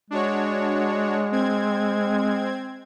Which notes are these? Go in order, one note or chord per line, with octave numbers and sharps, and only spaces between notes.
G#3 D4 F#4 C#5
C4 G#6